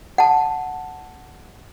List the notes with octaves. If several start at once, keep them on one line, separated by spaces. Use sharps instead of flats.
F#5 A5